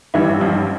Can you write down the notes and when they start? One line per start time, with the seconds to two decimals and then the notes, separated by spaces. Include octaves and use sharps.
0.14 A1 G2 D#3 E3 E4
0.41 F3 F4